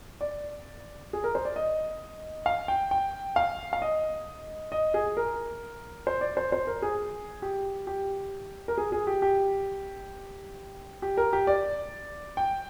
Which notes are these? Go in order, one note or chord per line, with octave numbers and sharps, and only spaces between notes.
D5
G#4
A#4
C5
D5
D#5
F5
G5
G5
F5
F5
D#5
D#5
G#4
A#4
C5
D5
C5
C5
A#4
G#4
G4
G4
A#4
G#4
G#4
G4
G4
G4
A#4
G4
D5
G5